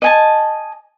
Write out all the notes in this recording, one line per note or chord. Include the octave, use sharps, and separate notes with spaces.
D#5 G#5 A5